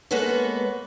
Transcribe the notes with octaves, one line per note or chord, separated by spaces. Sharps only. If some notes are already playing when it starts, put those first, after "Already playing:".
G#3 A#3 B3 A4 B4 C#5